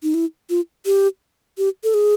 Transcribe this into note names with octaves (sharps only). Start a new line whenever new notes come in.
D#4
E4
F4
G4
G4
A4
G#4